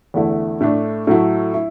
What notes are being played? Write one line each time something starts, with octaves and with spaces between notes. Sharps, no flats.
E2 D3 A3 E4
A2 A3 D4
A2 F#3 A3 E4
E4